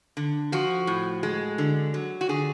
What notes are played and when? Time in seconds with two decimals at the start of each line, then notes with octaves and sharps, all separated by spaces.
0.17 D3
0.52 F3 F#4
0.87 A2
1.23 G#3
1.58 D3
1.94 F#3
2.21 F#4
2.29 D3 G#4